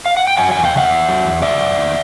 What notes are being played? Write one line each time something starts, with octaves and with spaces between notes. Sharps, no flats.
F5
F#5
G5
F#3 F#5 G#5
E2 F#5 G#5
F5 G5
C#3 E5 F#5
E2
F#3
E2
F#3 D5 E5
F#2
D#3